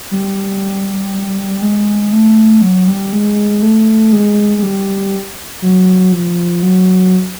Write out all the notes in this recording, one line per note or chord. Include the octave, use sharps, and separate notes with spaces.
G3
G#3
A3
F#3
G3
G#3
A3
G#3
G#3
G3
F#3
F3
F#3